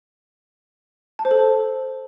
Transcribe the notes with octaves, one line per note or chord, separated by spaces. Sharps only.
A5
C5
A4